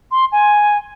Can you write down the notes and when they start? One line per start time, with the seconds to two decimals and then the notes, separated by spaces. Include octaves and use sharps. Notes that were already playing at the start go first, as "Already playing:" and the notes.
0.12 C6
0.32 G#5